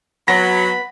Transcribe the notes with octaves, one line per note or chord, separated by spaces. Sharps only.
F#3 B3 B5 A#6